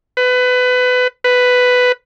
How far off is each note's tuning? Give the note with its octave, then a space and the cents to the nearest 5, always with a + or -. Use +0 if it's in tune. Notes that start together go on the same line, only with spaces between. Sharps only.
B4 +25
B4 +10